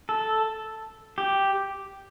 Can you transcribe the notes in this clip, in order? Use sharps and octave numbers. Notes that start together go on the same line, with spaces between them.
A4
G4